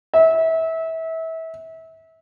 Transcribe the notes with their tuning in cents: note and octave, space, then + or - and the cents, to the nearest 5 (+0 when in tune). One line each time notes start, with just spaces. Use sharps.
E5 -25